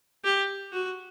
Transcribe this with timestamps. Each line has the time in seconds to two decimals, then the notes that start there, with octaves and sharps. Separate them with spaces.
0.24 G4
0.73 F#4